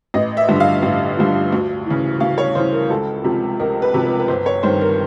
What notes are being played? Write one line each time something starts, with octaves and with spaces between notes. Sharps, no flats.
A1 D#5
E5
G2 D3 F3
F5
A1
G2 D3 F3
D2
C#3 E3
D2 F5
C#5
C#3 E3 C5
A#4
C#2 A4
C3 F3
C#2 A#4
B4
C3 F3
B4
B4
G1 C5
C#5
G2 D#3 C5
A#4